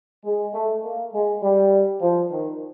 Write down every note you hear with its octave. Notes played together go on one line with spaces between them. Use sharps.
G#3
A3
A#3
G#3
G3
F3
D#3